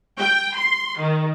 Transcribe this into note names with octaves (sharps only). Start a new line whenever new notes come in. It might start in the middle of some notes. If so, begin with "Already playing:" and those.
G5
C6
D#3